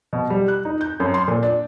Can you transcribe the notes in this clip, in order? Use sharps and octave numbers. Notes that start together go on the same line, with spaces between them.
B2
G3
F#6
D#4
G6
F#2
C6
A#2
D4